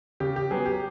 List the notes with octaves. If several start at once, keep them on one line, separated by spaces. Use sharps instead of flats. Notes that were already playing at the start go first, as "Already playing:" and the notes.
C#3 G4
G4
F#3 B3 G#4
G4